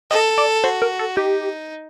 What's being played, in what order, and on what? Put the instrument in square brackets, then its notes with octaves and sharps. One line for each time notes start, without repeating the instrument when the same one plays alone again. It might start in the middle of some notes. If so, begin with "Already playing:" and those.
[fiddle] A4 [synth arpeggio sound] D#5
[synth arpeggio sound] D5
[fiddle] F#4 [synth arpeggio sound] C5
[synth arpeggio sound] A#4
A4
[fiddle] D#4 [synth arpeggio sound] G4